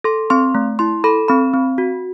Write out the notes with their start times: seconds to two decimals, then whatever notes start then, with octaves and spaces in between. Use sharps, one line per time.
0.04 A4 C6
0.30 C4 C6
0.55 A3
0.79 E4 C6
1.04 A4 B5
1.28 C4 B5
1.54 C4
1.78 F#4